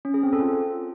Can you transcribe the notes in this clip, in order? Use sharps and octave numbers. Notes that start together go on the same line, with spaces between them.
C#4
G#4
C4
A4
F4